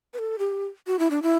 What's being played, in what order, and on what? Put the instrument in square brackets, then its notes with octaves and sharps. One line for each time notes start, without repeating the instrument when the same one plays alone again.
[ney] B4
A4
G4
F#4
E4
D4
E4